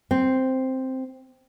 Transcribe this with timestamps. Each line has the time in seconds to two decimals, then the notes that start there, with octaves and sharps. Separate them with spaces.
0.11 C4